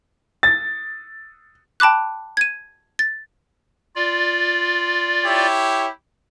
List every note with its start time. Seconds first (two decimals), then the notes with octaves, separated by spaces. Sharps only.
0.43 A6
1.80 G5 A5 B5 D6 F#6
2.37 G#6 D#7
2.99 A6
3.95 F4 D5
5.24 E4 G4 C#5